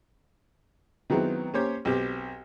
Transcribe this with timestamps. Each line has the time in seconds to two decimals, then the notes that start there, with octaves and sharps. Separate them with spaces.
1.10 D#3 F#3 G#3 B3 C4 E4
1.54 A#3 C#4 G4 C5 C#5
1.85 B1 C4 G4